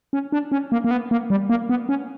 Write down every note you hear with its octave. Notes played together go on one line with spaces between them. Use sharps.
C#4
D4
C#4
A#3
A#3
B3
A#3
G3
A#3
B3
C#4